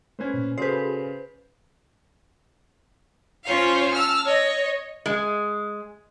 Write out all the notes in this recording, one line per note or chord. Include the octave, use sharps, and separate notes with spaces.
A3 C#4 B4 C5 G#6
A#2
C#3 F#4 G#4 A4 B4 C5 G6
C#4 F4 C5 C#5 F5
A5 E6 F6
C#5 D#5
G#3